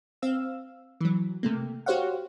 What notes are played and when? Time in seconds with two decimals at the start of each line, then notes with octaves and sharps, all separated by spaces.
0.22 C4 F5 E6
1.01 E3 F#3
1.43 C3 A3 A#3
1.86 F#4 G4 C5 C#5 F5 F#5